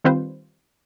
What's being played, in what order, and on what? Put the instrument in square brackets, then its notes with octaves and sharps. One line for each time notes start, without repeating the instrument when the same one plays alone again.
[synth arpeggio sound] D#3 G3 C4 F4 B4 C5